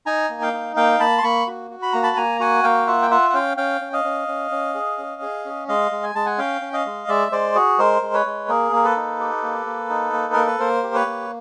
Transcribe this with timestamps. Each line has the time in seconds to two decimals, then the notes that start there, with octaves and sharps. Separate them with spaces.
0.06 D#4 G#5 A#5
0.30 A#3
0.41 F5 G5
0.53 D#4
0.76 A#3 F5 G5
1.00 A#3 A5 B5
1.18 C6
1.23 A#3 B5 C#6
1.47 F#4
1.71 F#4
1.82 B5
1.93 A#3 A#5
2.03 A5 B5
2.17 A#3 G#5 A#5
2.40 F#4 F#5 G#5
2.63 A#3 F5 G5
2.87 F4 E5 F#5
3.02 G5
3.11 F4 E5 F#5
3.30 F#5
3.33 C#4 F5 G5
3.57 C#4 F5 G5
3.81 C#4
3.93 D#5 F5
4.04 C#4
4.28 C#4
4.51 C#4
4.75 G#4
4.98 C#4
5.22 G#4
5.45 C#4
5.68 G#3 D#5 F5
5.91 G#3
6.03 G#5
6.15 G#3 A5
6.26 F#5 G#5
6.38 C#4 F5 G5
6.61 C#4
6.73 D#5 F5
6.86 G#3
7.08 G#3 D5 E5
7.32 G#3 C5 D5
7.55 F#4 G#4
7.79 G#3 A#4 C5
8.02 G#3
8.14 B4 C#5
8.26 G#3
8.48 A#3 G#4 A#4
8.72 A#3 A#4
8.84 A4 B4
8.96 D#4
9.20 G4
9.43 A#3
9.66 A#3
9.90 D#4
10.13 A#3
10.33 A#3 A#4
10.46 B4
10.59 A#3 A#4 C5
10.83 G4
10.94 B4 C#5
11.06 A#3